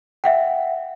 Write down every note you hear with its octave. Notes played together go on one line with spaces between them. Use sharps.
E5 F#5 G5